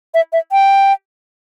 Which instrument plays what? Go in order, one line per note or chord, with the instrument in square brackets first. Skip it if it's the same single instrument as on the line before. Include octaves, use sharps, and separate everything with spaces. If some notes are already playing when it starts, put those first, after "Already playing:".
[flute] E5
E5
G5